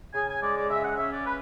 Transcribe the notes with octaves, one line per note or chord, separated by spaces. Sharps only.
C#3 G#5
G#5
G#3 D5
D5
C#3 E5
F#5
C#4 E5
D5
B4